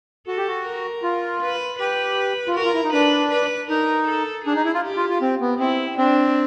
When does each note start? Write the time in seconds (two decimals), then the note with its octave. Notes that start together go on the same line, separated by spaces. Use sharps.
0.27 F#4 A4
0.37 G4
0.48 F#4
0.66 A#4
1.03 F4
1.41 B4
1.79 G4 B4
2.48 F4
2.55 F#4 A#4
2.65 F4
2.74 E4
2.84 D#4
2.93 D4 B4
3.31 B4
3.70 D#4 A#4
4.07 A4
4.45 D4 G#4
4.56 D#4
4.65 E4
4.74 F4
4.84 G4
4.97 F4
5.09 F4
5.22 C4
5.41 B3
5.59 C4 E4
5.98 C4 D4